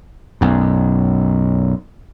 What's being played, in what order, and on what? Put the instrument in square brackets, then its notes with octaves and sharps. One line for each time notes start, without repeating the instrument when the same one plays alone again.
[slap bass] B1 F#2